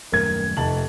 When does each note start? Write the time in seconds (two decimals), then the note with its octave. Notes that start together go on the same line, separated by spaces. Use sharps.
0.12 D#1 F#2 A3 A#4 G#6
0.57 F1 C3 A5 F#7